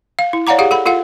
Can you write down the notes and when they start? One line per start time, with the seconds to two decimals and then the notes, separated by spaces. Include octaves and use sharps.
0.19 F5
0.33 E4
0.47 C#5 D5 F5 F#5 A#5 D6
0.58 G4 G#4 F5 F#5
0.71 A4 F#5 B5
0.86 F4 A4 F5 F#5